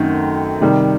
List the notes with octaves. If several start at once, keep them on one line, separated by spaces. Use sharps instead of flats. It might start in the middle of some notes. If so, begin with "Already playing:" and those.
Already playing: F#2 D#3 A3 C4 F#4
C3 D#3 G3